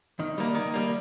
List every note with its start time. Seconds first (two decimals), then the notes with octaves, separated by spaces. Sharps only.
0.19 D#3
0.38 G3 A#3
0.55 D#3
0.74 G3 A#3